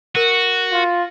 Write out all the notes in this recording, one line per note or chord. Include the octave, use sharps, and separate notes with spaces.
F#4 A#4 D#7
F4